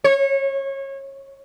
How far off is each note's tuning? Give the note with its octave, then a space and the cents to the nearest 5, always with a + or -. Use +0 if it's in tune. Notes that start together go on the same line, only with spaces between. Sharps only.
C#5 -25